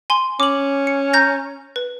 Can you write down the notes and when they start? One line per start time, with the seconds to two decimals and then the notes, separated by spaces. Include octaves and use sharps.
0.10 G#5 C6
0.40 C#4 D6 F#7
0.87 C#7
1.13 A#5 G6 A#6
1.76 B4